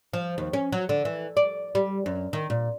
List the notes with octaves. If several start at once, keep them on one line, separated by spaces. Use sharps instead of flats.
F3
D#2
C#4
F#3
D3
E3
D5
G3
F#2
D#3
A#2